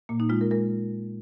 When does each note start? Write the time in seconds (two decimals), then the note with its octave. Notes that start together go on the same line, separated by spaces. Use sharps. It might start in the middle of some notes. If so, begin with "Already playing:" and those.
0.09 A#2 A#3
0.20 D#4
0.29 G#3 F4
0.41 A#4
0.51 G#3 A#4